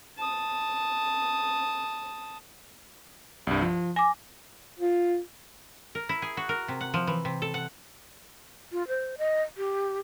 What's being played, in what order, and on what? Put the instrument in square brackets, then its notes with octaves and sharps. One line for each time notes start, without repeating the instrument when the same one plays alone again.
[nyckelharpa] A5 D#6
[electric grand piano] C2 G2
F3
[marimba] G#5 D6 [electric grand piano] A#6
[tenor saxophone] F4
[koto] A#4
E4
G#4
F#4
A#4
C3
F#5
F3
E3
C3
A4
F#5
[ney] F4
C5
D#5
G4